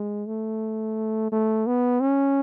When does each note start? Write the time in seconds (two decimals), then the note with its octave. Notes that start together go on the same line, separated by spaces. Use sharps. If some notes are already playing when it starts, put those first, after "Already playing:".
Already playing: G#3
0.27 A3
1.32 A3
1.67 B3
2.01 C#4